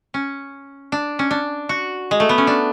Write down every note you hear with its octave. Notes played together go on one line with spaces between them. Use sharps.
C#4
D4
C#4
D4
F#4
G#3
A3
B3
C#4
D4